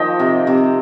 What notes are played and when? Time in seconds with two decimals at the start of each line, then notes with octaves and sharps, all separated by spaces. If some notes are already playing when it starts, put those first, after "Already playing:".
Already playing: D#3 F3 A#3 C5 D#5 G5
0.19 C3
0.47 C3